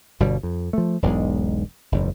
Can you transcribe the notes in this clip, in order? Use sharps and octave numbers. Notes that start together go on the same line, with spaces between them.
G1 B2 G3
F2
F3 A3
E1 B1 G#2 G#3
F#1 E2 G#2